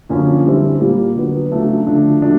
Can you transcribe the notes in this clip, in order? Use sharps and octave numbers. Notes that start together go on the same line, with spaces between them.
F#2 D3 F3 A#3 C#4
D3 G3 C4 E4
A#2 G3 A#3
D3 F#3 B3
C#3 F#3 A3 D4
D3 F3 A3 D4
F#3 A3 D4